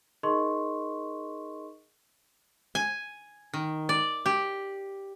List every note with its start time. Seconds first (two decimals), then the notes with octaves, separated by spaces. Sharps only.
0.23 D#4 G#4 A#4 D#5 C6 C#6
2.75 G#5
3.54 D#3
3.89 D5
4.26 G4